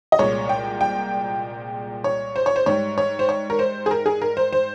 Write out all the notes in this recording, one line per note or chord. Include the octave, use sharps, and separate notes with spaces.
D#5
C2 A#2 G#3 C#5
G5
G5
C#5
C5
C#5
C5
G#2 G3 C#5
C#5
C5
C#5
A#4
C5
G#4
A#4
G#4
A#4
C5
C5